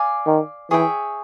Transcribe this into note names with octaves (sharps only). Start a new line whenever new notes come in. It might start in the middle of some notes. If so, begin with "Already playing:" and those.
Already playing: D5 F5 G#5
D#3
E3 G#4 C#5 E5 G5